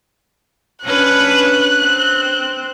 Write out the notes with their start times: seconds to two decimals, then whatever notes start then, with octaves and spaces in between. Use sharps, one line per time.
0.84 C#4 D4 B4 F#6
1.84 C4